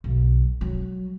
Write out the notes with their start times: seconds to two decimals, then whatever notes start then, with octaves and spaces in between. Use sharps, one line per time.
0.04 B1
0.61 F#3